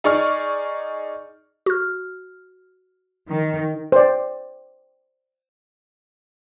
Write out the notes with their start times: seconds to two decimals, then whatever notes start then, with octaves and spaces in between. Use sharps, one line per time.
0.04 D#4 G#4 D5 C#6 F6
1.66 F#4 F6
3.29 D#3
3.92 C5 D5